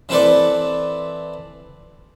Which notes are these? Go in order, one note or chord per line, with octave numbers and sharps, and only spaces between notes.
E3 C4 E4 A4 B4 D5